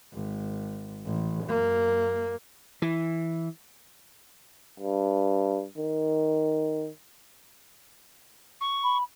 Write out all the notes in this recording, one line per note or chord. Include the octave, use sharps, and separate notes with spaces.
G#1
A1
F#2 A#3
E3
G2
D#3
C#6
B5